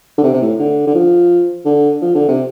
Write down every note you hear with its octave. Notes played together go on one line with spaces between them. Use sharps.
D3
C3
C3
A2
D3
D3
F3
D3
F3
D3
C3